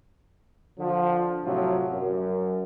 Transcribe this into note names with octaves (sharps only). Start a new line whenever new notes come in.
D3 F3
A2 C3 F3 F#3
F#2